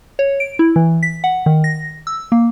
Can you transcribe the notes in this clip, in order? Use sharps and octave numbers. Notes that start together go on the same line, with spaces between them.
C#5
D7
E4
E3
B6
F#5
D#3
A#6
E6
A#3